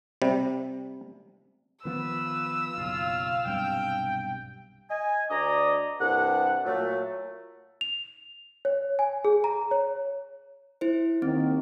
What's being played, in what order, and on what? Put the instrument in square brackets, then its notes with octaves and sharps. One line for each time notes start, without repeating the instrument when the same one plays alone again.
[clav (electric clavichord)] C3 G3
[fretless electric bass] D#3 F3 B3 [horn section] F4 B4 [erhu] E6
[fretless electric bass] F#1 B1 [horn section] C#4 F4 [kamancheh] F5
[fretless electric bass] B1 G2 C3 [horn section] G5
[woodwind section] D#5 G#5
D2 D4 D5 D#5 A#5
C2 G2 D4 F#5
A#2 F#3 A3
[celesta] F7
C#5
G#5
G#4
A#5
C#5
[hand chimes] E4 C5
[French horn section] D#2 D#3 [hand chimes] C4